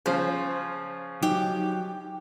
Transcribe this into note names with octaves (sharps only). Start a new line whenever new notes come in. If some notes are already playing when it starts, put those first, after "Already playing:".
C#3 F3 C5
F#3 D#4 G4